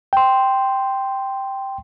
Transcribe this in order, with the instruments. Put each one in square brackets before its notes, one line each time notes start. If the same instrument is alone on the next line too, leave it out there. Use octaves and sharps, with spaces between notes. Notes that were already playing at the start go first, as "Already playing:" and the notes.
[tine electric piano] G5 C6